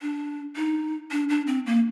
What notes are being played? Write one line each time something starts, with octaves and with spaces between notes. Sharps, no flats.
D4
D#4
D4
D4
C4
A#3